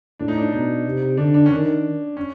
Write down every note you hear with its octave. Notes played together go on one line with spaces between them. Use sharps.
A2 D4
D#4
D4
B2 D#4
C3
D3 D4
D4
C#4
D#3 D4
C#4